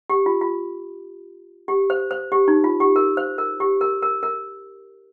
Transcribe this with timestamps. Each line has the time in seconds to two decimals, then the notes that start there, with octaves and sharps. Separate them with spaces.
0.10 G4
0.26 F4
0.41 F4
1.68 G4
1.90 C5
2.11 C5
2.32 G4
2.48 D#4
2.64 F4
2.80 G4
2.96 A#4
3.17 C5
3.38 A#4
3.60 G4
3.81 A#4
4.03 A#4
4.23 A#4